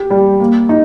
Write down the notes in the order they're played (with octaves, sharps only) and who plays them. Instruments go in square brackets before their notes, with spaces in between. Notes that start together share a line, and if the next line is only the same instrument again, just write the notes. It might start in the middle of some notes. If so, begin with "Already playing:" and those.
Already playing: [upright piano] G4
G3
A#3
D#4